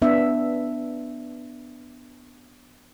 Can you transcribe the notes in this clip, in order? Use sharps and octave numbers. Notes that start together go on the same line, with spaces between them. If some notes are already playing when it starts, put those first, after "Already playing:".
B3 D4 E5